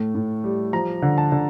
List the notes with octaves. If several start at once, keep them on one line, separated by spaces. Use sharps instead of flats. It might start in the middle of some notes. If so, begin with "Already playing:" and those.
Already playing: A2 A3
A2
G3
F3 A#5
D3
A5
D3